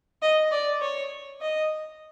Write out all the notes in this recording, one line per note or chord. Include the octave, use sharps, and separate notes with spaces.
D#5
D5
C#5
D#5